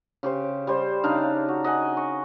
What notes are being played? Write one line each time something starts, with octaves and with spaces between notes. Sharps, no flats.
C#3 G4 C5
G3 C5
C#3 D4 D#4 F5
F#4
D#5 F#5 G#5
C#6